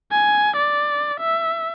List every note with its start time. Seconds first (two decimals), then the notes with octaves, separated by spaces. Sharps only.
0.11 G#5
0.57 D5
1.20 E5